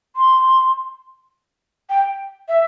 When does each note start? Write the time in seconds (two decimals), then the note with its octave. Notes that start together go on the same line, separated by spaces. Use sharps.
0.16 C6
1.90 G5
2.48 E5